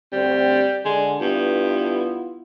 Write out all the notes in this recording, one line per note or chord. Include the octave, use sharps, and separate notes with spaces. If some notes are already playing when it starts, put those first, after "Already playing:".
D2 G3 C4
D3 G#3
G2 B3 E4 F4